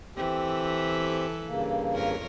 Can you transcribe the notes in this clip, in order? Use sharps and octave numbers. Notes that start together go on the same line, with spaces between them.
E3 C4 G4 A4
G2 C#3 A#3
F2 A#4 C#5